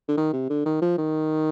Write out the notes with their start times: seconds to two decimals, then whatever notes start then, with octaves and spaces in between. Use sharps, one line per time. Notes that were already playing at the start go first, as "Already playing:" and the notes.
0.08 D3
0.17 D#3
0.33 C3
0.50 D3
0.65 D#3
0.82 F3
0.98 D#3